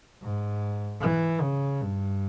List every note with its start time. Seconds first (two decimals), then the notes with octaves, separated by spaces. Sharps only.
0.22 G#2
1.01 E3
1.41 C#3
1.81 G2